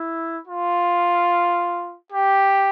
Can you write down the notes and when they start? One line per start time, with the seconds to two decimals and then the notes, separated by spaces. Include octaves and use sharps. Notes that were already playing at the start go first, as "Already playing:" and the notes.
Already playing: E4
0.47 F4
2.12 G4